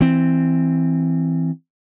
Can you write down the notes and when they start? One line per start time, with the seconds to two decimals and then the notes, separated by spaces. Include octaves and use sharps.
0.01 E3 C4